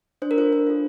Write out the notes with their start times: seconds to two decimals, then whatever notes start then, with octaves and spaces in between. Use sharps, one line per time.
0.22 D4 C5
0.31 A#4
0.37 F4 A4 C5
0.52 D4 C5
0.67 F4 A4